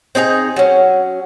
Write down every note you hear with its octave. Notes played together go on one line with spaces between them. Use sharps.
C4 D#4 G#4 A#5
F#3 C#4